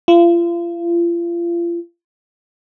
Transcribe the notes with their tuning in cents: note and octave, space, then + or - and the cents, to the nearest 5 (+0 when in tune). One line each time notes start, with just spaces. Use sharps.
F4 -35